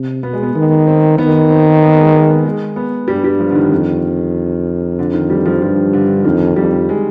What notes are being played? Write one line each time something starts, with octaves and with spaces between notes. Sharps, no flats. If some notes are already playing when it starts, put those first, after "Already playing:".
Already playing: C3
B2 B3
G#3
B3
D#3 B3
C4
D#3 B3
C4
B3
G#3
G#3
B3
G#3
B3
G2 G3
G3
F3
D3
D#3
F2
D3
D#3
G3
F3
G2 F3
D3
F2 D#3
F2 G3
G#3